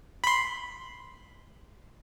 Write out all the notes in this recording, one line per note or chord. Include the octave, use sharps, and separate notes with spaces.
B5 C6